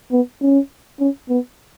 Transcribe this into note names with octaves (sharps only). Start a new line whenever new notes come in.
B3
C#4
C#4
B3